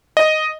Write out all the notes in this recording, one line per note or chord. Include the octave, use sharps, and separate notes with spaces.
D#5